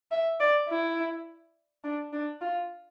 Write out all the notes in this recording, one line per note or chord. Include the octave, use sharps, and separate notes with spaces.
E5
D5
E4
D4
D4
F4